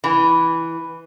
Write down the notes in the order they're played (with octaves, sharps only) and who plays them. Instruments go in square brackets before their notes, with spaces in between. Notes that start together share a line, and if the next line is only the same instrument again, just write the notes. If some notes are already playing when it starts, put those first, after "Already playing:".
[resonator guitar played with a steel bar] E3